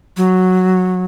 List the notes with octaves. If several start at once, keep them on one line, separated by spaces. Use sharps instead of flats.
F#3